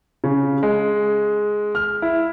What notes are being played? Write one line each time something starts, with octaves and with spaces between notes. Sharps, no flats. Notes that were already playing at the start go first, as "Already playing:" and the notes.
C#3
G#3
F6
E4